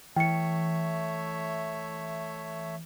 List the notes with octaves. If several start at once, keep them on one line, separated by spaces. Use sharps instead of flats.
E3 A3 C#5 E5 G5 C#7